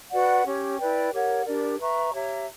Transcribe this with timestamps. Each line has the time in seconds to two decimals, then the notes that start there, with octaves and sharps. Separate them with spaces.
0.11 F#4 B4 D5 F#5
0.45 C#4 G4 C#5
0.78 E4 B4 D5 G5
1.12 G4 A#4 C#5 F#5
1.45 D4 G4 A#4 D5
1.79 B4 E5 A#5 C#6
2.12 G4 C#5 E5 A#5